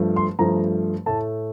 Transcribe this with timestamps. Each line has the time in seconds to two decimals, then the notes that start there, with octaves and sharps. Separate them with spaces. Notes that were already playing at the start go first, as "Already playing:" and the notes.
Already playing: G2 F3 A3
0.16 C6
0.39 G2 F3 A3 A#5
1.06 A2 A3 A5